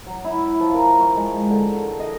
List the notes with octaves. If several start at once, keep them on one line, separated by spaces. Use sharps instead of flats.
F#3
E4
F3
A#4
C#6
G#3
D3
D#5